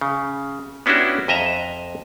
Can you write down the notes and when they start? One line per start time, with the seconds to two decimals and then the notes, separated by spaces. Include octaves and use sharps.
0.01 C#3
0.86 B3 C#4 D4 E4 F#4 G4
1.28 F2 D#5 E5 A#5